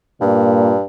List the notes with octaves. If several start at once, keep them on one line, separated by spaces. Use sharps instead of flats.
G2 A#2